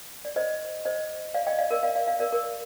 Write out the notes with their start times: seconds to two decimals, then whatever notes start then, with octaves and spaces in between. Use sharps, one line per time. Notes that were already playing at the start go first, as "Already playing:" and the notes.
0.25 D5
0.36 C5 D#5
0.85 C5 D#5
1.34 D5 F5
1.47 D#5 G5
1.59 D5 F5
1.71 A#4 D5
1.83 D5 F5
1.96 D5 F5
2.07 D5 F5
2.20 A#4 D5
2.32 A#4 D5